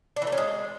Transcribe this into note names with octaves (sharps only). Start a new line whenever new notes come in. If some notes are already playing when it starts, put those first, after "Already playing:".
D4
E3
A3
C#4
G#3